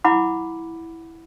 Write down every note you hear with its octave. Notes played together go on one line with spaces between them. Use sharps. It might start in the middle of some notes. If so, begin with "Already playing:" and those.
E4 F#5 B5 D6